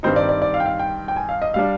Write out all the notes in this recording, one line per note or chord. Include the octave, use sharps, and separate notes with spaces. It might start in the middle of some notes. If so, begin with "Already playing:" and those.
G2 D#3 G3 C4 D#4 C5
D5
D5
D5
F5
G5
F5
G5
G5
G#5
F5
D#5
G3 D4 F5